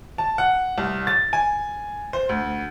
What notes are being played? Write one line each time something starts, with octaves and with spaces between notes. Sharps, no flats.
A5
F#5
C2
A6
G#5
C5
D2